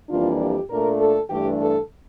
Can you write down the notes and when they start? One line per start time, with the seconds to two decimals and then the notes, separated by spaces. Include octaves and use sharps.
0.10 F2 E3 G3 A#3 D4 F4
0.40 G4
0.70 A#2 A3 D4 A#4
1.00 A4
1.30 G2 E3 A3 D4 G4
1.60 A4